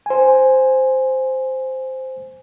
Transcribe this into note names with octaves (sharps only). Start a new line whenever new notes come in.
C5 G#5